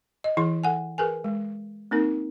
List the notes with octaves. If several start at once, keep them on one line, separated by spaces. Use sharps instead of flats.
D#5
E3 E4 G#4 C6
A4 F#5 G#5
G#4 A#4 B4 G#5
G#3
A#3 C4 D#4 A#4